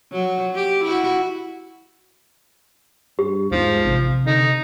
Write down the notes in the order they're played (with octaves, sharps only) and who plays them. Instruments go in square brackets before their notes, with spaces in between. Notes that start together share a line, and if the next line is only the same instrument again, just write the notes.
[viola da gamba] F#3
G4
E4 F#4
[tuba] G2 [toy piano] G4
[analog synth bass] E2 [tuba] G#2 [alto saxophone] F3
[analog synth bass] A1 [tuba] C3
[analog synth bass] D3 [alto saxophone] D#4